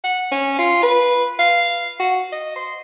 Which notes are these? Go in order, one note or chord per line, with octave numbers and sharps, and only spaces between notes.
F#5
C#4
F4
B4
F5
F#4
D#5
C6